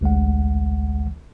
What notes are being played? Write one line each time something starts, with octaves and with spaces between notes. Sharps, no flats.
A1 D2 G#3 F#5